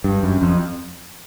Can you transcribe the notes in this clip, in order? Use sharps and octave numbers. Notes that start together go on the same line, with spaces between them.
G2
F#2
F2